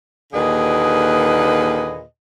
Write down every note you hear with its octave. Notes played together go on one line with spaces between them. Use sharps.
D#2 A#2 D3 G#4 B4 D#5